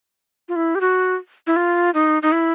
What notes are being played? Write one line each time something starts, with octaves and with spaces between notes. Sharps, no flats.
F4
E4
G4
F#4
E4
F4
D#4
D#4
E4